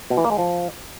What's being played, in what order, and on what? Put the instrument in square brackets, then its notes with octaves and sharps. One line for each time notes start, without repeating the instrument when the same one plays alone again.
[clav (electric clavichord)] B2
E3
A#3
G#3
F3